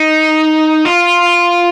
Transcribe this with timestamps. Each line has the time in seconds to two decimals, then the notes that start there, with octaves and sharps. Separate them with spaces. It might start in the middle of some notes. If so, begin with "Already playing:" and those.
Already playing: D#4
0.85 F4